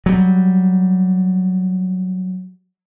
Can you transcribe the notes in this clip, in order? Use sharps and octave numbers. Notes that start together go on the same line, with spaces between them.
F#3 G3